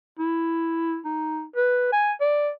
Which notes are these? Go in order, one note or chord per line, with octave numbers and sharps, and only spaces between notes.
E4
D#4
B4
G#5
D5